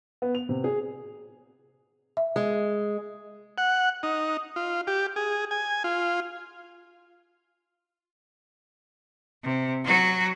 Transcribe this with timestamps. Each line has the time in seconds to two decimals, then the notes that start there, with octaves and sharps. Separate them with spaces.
0.22 B3
0.35 F7
0.49 C3
0.64 G#4
2.17 E5
2.36 G#3
3.58 F#5
4.03 D#4
4.56 F4
4.87 G4
5.16 G#4
5.51 G#5
5.84 F4
9.44 C3
9.85 F#3 F#4